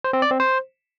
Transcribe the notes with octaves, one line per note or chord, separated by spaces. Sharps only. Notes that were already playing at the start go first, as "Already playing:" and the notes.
C5
C4
D5
C4
C5